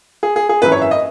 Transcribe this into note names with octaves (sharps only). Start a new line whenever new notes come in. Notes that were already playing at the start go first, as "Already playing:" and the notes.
G#4
G#4
G#4
G#1 F#2 E3 B4
C#5
E5
D#5